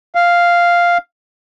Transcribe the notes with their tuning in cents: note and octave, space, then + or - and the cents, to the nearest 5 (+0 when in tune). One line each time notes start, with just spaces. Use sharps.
F5 -5